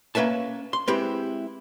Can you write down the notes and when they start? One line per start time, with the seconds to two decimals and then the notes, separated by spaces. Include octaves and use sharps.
0.15 A#3 C#4 B4 E5 A5
0.73 C6
0.88 G#3 C4 E4 G4 B4